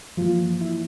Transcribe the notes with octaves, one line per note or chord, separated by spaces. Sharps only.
G2 E3 F3 A#3 F4
E4